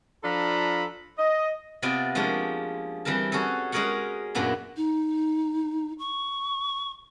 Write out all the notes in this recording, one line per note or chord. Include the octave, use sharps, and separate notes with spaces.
F3 D4 F4 A4 A#5 B5
D#5
C3 B3 F4 D5 D#5 G#5
F3 G#3 A#3 C#4 D4 G4
E3 G3 C4 A#4 A5
C#4 F#4 G#4 A4
G#3 C#4 G#4 A#4 C#5 F#5
F#2 A#2 B3 D4 E4
D#4
C#6